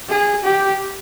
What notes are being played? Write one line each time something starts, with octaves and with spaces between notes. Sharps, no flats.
G#4
G4